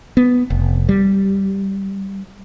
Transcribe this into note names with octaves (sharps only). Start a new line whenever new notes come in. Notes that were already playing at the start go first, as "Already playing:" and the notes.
B3
F1
G3